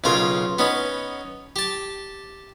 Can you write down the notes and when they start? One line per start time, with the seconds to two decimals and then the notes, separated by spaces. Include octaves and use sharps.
0.04 B1 C#3 F4 A#4
0.59 B3 C#4 D#4
1.56 G4 A5